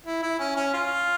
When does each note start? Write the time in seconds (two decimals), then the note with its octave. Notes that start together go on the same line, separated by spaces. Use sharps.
0.06 E4
0.23 E4
0.40 C#4
0.56 C#4
0.74 F4